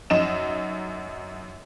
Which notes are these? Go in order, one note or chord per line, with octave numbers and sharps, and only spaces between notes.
F#2 D#4 E7